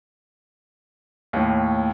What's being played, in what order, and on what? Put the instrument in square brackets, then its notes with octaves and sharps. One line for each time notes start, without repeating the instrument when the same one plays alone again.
[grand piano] D#2 A2